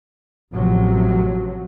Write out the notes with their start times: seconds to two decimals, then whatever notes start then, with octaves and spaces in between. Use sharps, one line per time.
0.53 A1 C3 F3 F#3